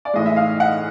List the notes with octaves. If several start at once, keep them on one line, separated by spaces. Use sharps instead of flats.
D5
A2 E3 G#3 D#5
E5
F5
F#5